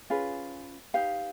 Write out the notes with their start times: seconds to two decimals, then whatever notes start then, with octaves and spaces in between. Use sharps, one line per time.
0.10 C#4 F4 G#4 B4
0.94 D#4 G4 B4 F5